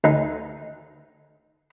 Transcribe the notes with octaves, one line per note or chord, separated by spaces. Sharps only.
D2 D#4